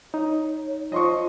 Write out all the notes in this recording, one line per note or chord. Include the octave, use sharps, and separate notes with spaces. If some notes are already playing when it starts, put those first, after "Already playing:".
D#4 C#5
F3 D#5 C6 C#6